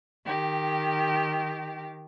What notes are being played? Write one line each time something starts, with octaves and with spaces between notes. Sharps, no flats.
D#3 G4